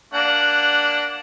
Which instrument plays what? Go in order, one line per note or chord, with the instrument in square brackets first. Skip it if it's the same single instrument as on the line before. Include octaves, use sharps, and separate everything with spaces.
[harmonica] A#3 D4 F#5